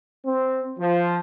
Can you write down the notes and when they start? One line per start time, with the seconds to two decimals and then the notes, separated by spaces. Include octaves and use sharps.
0.24 C4
0.78 F3